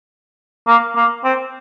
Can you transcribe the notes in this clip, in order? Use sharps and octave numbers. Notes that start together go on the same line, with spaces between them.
A#3
A#3
C4